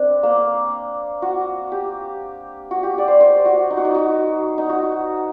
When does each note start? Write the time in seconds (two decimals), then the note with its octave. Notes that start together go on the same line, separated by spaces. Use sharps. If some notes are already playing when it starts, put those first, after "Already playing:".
Already playing: C4 D4
0.23 A#3
1.22 F#4
1.72 G4
2.71 F#4
2.83 G4
2.98 D5
3.08 C5
3.21 C5
3.45 F#4
3.70 D#4
3.77 F#4
3.85 D#4
3.95 F#4
4.58 D#4
4.69 F#4